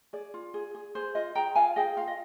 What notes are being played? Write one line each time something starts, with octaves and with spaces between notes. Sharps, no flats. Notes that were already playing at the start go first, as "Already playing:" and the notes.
G#4 D5
F4
G#4
G#4
G#4 C5
F4 C5 D#5
G#4 G5 A#5
F4 F5 G#5
G#4 D#5 G5
F4 F5
D#5